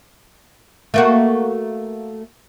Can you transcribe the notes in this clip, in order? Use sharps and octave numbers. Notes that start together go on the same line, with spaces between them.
A3 A#3 F#4